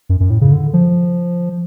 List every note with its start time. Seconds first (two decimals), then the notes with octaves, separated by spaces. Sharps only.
0.09 F#2
0.20 F#2
0.30 A2
0.41 C#3
0.52 D3
0.73 F3